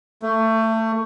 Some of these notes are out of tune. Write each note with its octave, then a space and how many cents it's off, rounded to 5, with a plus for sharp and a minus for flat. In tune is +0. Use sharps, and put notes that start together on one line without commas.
A3 +25